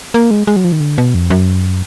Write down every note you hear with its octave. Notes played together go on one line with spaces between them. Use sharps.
A#3
G#3
G#3
F#3
F3
D#3
D3
B2
F2
F#2